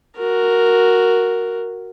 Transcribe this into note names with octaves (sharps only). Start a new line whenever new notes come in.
F#4 A#4